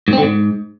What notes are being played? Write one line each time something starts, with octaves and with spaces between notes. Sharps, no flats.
G#2
C4
D3
G#2